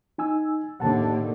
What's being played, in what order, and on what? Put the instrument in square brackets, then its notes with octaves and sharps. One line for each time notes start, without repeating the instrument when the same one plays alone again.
[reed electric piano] D#4 G#5 E6
[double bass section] D#2 A2 D3 [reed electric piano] F#5 A5